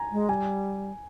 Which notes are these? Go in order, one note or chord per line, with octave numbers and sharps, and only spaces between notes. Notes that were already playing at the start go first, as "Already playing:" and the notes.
Already playing: G#5 A#5
G#3
G3 G#5